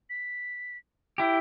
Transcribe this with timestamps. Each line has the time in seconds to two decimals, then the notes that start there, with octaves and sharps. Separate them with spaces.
0.10 B6
1.18 E4 G4 G5